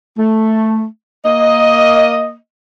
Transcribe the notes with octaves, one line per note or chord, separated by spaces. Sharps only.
A3
A#3 D#5